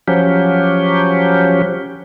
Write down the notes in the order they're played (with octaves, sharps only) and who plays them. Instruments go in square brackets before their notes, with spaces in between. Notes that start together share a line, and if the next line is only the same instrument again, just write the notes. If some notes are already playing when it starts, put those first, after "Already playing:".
[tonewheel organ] F3 F#3 C#4 G4